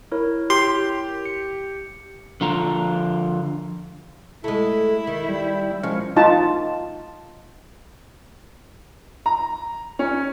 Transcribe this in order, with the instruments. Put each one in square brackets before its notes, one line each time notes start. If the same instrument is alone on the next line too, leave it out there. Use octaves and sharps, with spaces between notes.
[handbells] E4 A#4 C#5
[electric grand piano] G4 [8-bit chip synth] C6
[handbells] C#7
[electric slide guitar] D3 F3 F4 A#5
[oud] G#3 A3 [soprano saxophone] E4
[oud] D#3
[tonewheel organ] G3
[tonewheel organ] F3 C#4 [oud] G#3
[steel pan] D#4 F4 A5
[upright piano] A#5
C#4